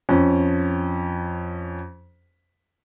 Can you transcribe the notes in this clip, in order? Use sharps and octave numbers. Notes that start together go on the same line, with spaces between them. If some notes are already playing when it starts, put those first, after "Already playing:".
F2 C#4